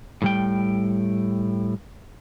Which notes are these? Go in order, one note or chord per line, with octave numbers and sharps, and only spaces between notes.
A2 G3 G5